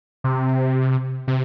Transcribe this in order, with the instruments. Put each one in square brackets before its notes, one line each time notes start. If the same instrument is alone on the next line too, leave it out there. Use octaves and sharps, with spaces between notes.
[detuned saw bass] C3
C3